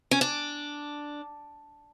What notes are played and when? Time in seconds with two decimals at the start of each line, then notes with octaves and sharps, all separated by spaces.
0.11 C#4
0.21 D4